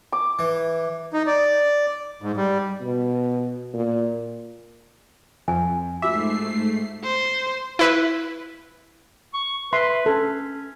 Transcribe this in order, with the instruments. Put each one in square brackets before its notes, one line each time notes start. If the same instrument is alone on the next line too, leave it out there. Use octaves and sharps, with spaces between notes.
[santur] D6
[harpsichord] E3
[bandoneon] D#4
D5
G#2
G3
[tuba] B2
A#2
[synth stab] F2 [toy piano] G#5
[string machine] G#2 A3 C7 [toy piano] F4 F#4 D6 [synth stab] E5
[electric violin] C5
[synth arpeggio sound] E4 B4
[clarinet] C#6
[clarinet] B4 [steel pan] E5 C6
[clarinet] C#4 [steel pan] A4